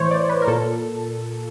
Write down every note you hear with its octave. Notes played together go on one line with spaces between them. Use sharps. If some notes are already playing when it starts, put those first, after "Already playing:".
Already playing: A2 E3 C5 C#5
D5
B4
A#4
A#2 A4